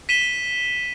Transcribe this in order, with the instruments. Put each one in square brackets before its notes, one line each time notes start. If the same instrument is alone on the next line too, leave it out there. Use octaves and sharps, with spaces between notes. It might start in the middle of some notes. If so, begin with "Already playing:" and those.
[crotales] B6 D#7 E7 G7